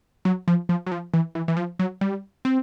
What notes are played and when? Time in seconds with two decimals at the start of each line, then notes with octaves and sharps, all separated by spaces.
0.25 F#3
0.48 F3
0.69 F3
0.86 F#3
0.91 F3
1.14 E3
1.35 E3
1.48 E3
1.57 F3
1.79 F#3
2.01 G3
2.45 C4